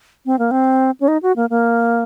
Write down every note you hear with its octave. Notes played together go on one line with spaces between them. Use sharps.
C4
A#3
C4
C#4
D#4
F#4
A#3
A#3